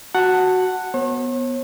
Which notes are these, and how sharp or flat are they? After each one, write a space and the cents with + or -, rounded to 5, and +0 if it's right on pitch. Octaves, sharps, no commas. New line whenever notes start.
F#4 +0 F#5 +0 A5 +15
B3 +0 C#5 -45